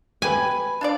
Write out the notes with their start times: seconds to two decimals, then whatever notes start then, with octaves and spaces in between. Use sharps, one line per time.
0.22 G4 B4 G#5
0.81 D4 F4 D5